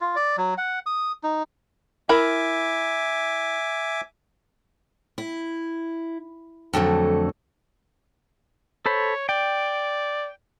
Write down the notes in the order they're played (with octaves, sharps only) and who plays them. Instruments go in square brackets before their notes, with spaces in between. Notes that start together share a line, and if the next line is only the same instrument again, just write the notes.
[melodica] F4
D5
F#3
F#5
D#6
D#4
[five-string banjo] E4 A#4 B5 [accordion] E5 G#5 D6
[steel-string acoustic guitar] E4
F2 D3 F#3 A3
[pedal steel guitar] A4 C5 B5 [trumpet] C#5
[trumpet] D5 [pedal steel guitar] G5